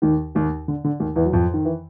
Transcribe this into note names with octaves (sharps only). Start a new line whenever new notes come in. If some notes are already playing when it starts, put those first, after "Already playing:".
D#2 D#3
D#2 D#3
D3
D3
D#2 D#3
E2 E3
F#3
F2 F3
D#3
E3